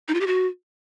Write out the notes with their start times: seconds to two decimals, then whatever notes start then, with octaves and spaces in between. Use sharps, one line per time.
0.08 D#4
0.14 F4
0.21 G4
0.27 F#4